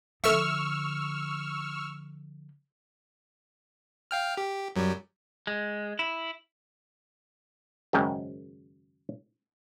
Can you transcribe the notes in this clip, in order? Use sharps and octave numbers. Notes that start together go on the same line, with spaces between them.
D3 F3 A4 E5 C#6 E6 F6
F5 G5 F6
G4
F#2 F#3 G3
G#3
E4
G#1 F#2 C#3 G#3 A#4 G5